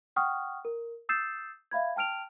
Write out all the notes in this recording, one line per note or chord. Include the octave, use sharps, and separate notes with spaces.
F#5 G5 C#6 D#6 F6
A#4
D#6 E6 G6 A6 C7 E7
E5 F5 B5 G#6
G5 A5 F6 D7 F7